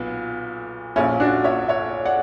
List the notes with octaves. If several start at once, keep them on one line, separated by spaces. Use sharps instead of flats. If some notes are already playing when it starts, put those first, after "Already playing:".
Already playing: B1 A#2 B3
A#1 A#2 C#4 E4
D4 F#4
C#5 E5
C#5 E5
D5 F#5